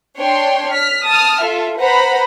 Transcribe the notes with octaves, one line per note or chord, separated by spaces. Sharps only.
D4 C#5 G5 C6
F6 B6
A5 D#6 F6
F4 A4 E5
B4 C5 F#5 A#5 B5